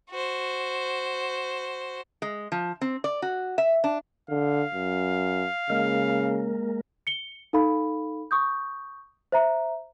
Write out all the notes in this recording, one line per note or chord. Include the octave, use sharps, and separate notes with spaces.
F#4 C5
G#3
F3
C4
D5
F#4
E5
D4
D3 F5
F#2
C#3 G#3 A#3 A#4
C#7 G7
D#4 A4 F5 B5
C#6 D#6 G6
C5 E5 A#5